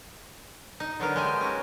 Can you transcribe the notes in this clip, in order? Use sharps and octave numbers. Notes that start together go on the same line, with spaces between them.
D#4
D3 F#3 B3 A#4
G#3 G4 G#5
C#4 F#4